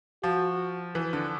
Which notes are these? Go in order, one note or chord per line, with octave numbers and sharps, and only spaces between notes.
F3 F#4
E3
D3